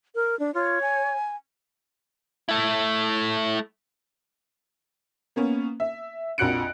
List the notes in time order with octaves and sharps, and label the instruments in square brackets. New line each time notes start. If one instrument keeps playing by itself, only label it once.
[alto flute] A#4
D4
[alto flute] F4 [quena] C#5
[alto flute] G#5
[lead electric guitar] A3 E4
[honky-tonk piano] A#3 B3 C#4
E5
A#1 F2 F#4 F#6 C#7 D7